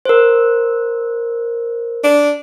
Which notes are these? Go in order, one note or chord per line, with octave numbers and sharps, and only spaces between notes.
A#4 C5
D4